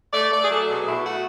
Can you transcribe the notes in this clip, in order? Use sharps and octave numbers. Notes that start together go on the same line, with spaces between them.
A3 D5
A3 D5
G#4
F#3 A4
B2 G#4
B2 E4
A3 F#4